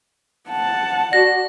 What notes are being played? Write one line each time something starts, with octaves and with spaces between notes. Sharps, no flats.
F#5 A5
F#4 D5 A#6